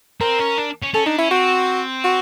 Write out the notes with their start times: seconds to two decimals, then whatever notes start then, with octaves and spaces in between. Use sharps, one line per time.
0.21 C4 A#4
0.40 C#4
0.58 D4
0.83 C#4
0.94 C#4 A4
1.06 D4 D#4
1.18 C#4 E4
1.31 C4 F#4
2.04 F#4